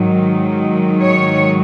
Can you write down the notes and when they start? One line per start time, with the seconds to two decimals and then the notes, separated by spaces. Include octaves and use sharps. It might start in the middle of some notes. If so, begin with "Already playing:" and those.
Already playing: G#2 D#3 F#3
1.01 C#5